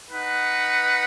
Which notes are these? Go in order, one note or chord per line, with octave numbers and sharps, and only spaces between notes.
D#4 B4 F#5